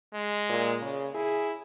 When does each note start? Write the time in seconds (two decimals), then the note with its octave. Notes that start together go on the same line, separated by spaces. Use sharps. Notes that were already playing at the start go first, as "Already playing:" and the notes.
0.14 G#3
0.49 A#2
0.82 C#3
1.15 E4 G#4